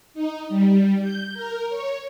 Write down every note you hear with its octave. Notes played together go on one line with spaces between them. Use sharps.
D#4
G3
G6
A#4
C#5